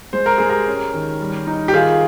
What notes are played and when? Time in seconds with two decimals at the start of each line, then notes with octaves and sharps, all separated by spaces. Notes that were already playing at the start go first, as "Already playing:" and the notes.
0.13 G#3 C5
0.26 A#4
0.38 G#3 G#4
0.50 G4 A#4
0.67 C#4
0.94 D#3
1.21 G3
1.47 D#4
1.68 G4
1.73 D#3 F4 G#4